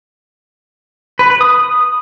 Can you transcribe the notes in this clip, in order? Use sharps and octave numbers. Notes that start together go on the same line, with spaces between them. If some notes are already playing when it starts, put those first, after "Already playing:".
B4
B4
D#6